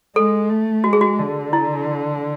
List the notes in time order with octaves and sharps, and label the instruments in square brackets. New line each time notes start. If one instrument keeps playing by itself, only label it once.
[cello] G#3 [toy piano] A4
[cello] A3
[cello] G#3 [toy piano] F#4
[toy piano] G#4
F#4
[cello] D3
[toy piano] E4